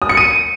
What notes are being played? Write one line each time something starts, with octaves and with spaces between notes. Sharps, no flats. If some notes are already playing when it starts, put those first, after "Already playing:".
D#6
C#7
D#7